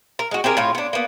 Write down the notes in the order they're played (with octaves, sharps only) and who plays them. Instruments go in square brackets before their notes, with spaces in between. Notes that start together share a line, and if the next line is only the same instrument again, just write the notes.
[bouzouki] A#4
G#3 F#4
C4 G4 G#4 A#4
A2 F4 C#5
B3 D4
A#3 B3